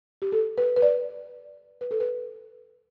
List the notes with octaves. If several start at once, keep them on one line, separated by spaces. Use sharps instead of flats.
G4
A4
B4
B4
D5
B4
A4
B4